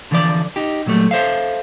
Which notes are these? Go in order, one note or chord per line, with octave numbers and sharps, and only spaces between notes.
D3 E3 F3 C#5 D5
D#4 G4
A#2 F#3 G3 A3
A4 C5 E5 F5